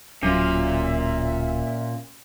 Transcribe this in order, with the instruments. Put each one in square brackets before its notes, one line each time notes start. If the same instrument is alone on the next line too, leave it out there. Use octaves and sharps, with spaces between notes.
[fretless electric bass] D1 F#3 [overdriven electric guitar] A#2 F4 [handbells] C#4 [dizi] E5